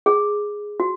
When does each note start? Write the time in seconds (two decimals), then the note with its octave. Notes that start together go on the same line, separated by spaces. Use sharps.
0.06 G#4
0.80 F#4